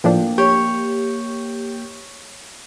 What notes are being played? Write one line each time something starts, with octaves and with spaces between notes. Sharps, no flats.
A2 F3 A#3 D4 G5
G4 C#5